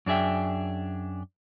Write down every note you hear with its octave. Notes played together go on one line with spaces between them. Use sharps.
F#2 D4 G#4 E5 G5